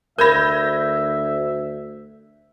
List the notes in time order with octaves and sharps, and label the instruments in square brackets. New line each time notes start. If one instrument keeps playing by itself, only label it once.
[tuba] D2 [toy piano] A#4 B5 [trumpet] E5 [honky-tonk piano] G6 G#6 A#6